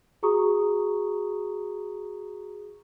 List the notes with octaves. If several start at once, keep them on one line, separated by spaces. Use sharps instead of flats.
F#4 G#4 A#5 C#6 D#6